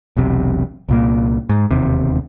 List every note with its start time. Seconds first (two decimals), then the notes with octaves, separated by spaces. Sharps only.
0.17 E1 B1 C3
0.89 C2 A#2 A#3
1.49 G#2
1.71 E1 D#2 C3